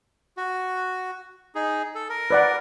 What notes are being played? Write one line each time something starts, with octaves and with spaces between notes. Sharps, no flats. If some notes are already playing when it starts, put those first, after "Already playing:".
F#4
D#4 G#4
A4
A#4
B4 D5 F#5